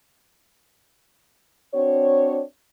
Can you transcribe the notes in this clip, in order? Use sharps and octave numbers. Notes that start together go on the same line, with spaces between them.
C4 D4 F#4 C#5